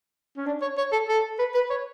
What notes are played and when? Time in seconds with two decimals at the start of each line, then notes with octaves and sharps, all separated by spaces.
0.37 C#4
0.46 D4
0.62 C#5
0.77 C#5
0.92 A4
1.08 A4
1.39 B4
1.55 B4
1.70 C#5